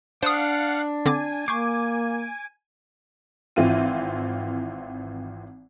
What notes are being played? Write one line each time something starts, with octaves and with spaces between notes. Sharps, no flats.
D4 C5 F5 F#5 D#6
D3 C4 G#5 D6
A#3 C#6 D6 G6 C7
G#1 E3 C4 E4 F4 D#7